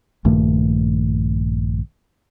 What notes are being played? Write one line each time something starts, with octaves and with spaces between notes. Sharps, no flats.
A#1 G2 D#3 A3